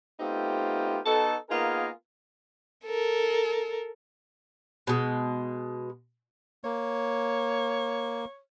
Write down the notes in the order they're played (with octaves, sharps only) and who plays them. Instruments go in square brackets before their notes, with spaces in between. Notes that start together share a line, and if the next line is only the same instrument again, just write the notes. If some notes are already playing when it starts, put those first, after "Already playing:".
[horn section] A3 B3 C4 D#4 F4 G4
B3 D#4 F#4 A4
A#3 B3 D#4 F4 G#4 A#4
[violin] A4 A#4
[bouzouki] B2 G#3
[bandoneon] A#3 [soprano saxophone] C#5